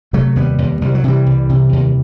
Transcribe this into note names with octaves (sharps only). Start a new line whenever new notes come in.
C3 F#3 A3
D#2 G3 B3
D#2
C2 G3
F#3
C3 E3 G3
C2
C3
D#2